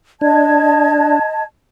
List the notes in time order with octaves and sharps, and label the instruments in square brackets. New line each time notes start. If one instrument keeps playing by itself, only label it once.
[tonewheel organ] D4 [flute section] D#5 A5 G#6